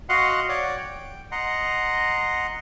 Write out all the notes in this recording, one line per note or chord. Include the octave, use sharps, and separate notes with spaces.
F#4 D#5 F5 F#5 C6
C#5 D5 F#5
G5
D#5 F#5 A#5 C6